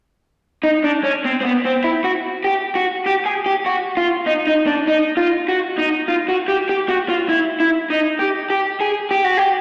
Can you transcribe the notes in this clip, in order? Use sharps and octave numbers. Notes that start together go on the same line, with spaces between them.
D#4
D4
C#4
C4
C4
B3
C4
E4
F#4
G4
F#4
G4
G#4
G4
F#4
F4
D#4
D#4
D4
D#4
F4
F#4
D#4
F4
F#4
G4
G4
F#4
F4
E4
E4
D#4
G4
G4
G#4
G4
F#4
G4